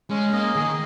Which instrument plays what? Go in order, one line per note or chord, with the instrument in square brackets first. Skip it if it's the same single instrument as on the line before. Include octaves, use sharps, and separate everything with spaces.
[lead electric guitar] G#3 [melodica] C#4
[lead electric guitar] A#3 [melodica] D#5
[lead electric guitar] D#3 [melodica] G#4